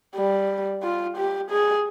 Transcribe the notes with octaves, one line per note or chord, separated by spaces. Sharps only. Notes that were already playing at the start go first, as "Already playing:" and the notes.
G3
F4
G4
G#4